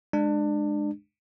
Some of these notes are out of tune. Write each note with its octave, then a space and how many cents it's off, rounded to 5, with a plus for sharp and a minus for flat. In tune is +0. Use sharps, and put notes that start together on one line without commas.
G#3 +0 D4 +25